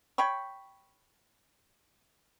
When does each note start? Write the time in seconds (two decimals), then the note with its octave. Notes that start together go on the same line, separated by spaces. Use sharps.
0.18 C#5 G5 B5 C#6